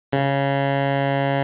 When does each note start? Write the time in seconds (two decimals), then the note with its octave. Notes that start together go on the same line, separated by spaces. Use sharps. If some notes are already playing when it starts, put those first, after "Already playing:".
0.13 C#3